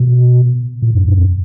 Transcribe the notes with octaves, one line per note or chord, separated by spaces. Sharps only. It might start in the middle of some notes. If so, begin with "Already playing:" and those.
Already playing: B2
A#2
F#2
F#2
F2